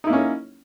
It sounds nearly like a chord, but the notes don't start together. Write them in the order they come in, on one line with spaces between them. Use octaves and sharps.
D#4 E4 A#3 C#4